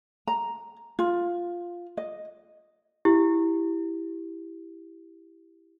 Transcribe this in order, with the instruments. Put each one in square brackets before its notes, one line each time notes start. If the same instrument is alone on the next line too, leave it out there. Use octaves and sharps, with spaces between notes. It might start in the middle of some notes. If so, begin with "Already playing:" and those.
[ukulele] A#5
F4
D#5
[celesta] E4 G4